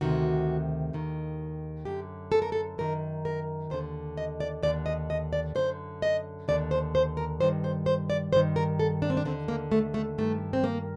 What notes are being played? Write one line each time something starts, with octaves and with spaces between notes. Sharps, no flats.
D2 C3 D#3 F#4
D#2 D#3
F#2 D3 G4
A4
A#4
A4
F#2 D#3 A#4
A#4
D#2 D3 C5
D#5
D5
D#2 D3 D5
D#5
D#5
D5
F#2 D3 C5
D#5
D#2 D3 D5
C5
C5
A#4
G2 D#3 C5
C5
C5
D5
G2 D#3 C5
A#4
A4
D4
C4
D4
D#2 D3 C4
A#3
A3
A3
G2 D#3 A3
C4
A#3